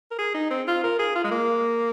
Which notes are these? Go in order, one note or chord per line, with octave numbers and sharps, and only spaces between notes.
A#4
G#4
D#4
C4
F4
A#4
G#4
F4
G#3
A#3